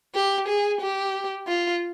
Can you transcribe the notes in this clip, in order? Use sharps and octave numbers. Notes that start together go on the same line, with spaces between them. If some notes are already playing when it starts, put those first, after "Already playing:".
G4
G#4
G4
F4